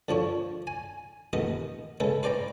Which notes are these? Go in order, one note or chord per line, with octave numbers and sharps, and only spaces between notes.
D3 F3 D4 C#5
G#5
A1 D#2 B3 D#5
C#3 G#3 A4 B4
B4 C5 D5 G5 A#5